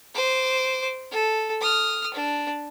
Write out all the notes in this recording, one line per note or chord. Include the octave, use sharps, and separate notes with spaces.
C5 D6
A4
D#6 F6
D4